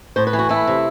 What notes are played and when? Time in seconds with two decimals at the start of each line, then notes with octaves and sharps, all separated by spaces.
0.16 A2 C5
0.27 B4
0.33 E3
0.39 F#4
0.49 A3 E4
0.67 C3